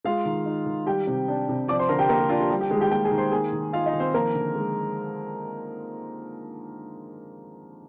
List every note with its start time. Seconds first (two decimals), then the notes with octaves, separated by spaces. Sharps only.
0.05 G#3 F4 F5
0.25 D#3
0.46 D#4
0.66 D#3
0.86 G3 G4 G5
1.07 C3
1.28 D4
1.49 C3
1.68 F3 D5 D6
1.79 C5 C6
1.89 D3 A#4 A#5
1.99 G4 G5
2.09 A#3 A#4
2.20 G4
2.29 D4 F4
2.40 G4
2.50 G3 G4
2.61 G4
2.70 D#3 G#3 G#4
2.81 G4 G5
2.91 A#3 G4 G5
3.04 G#4 G#5
3.11 D#3
3.18 C5 C6
3.32 A#3 G#4 G#5
3.53 D#3
3.73 D#4 F4 F5
3.86 D#4 D#5
3.93 D#3
4.00 C4 C5
4.14 F3 A#3 A#4
4.34 D3
4.55 G#3